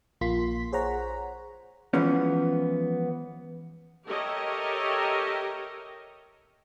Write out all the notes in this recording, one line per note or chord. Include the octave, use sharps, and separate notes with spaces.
A#1 A#3 F4 C6 B6
G#4 C5 C#5 F#5 A#5
E3 F3 G#3 B3 C#4
G4 A4 A#4 C#5 D#5 E5